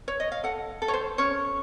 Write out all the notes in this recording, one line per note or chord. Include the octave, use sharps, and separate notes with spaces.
C#5
D#5
F5
A4 F#5
A4
C#5
C5
C#4 C#5